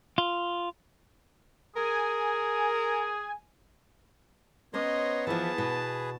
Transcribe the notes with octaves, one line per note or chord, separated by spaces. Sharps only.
F4
G#4 A#4 G#5
B3 C#4 C5 C#5 D#5 A#5 C6
E3 F3 G#4 B4 A5
B2